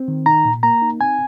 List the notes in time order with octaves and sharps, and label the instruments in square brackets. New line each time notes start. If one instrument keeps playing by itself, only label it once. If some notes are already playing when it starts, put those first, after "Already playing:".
Already playing: [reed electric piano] C4
D#3
D#4 A#5
A#2
A#3 A#5
D#4
C4 G#5